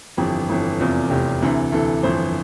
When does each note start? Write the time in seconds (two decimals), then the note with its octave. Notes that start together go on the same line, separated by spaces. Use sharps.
0.17 G1 F2 E3 G4
0.49 G1 F2 E3
0.79 F1 E2 C3 F4
1.10 F1 E2 C3 G4
1.41 D2 C3 E3
1.72 D2 C3 E3 A4
2.03 G1 F2 E3 C5